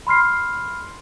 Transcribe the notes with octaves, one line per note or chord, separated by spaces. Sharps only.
B5 C6 F6 C7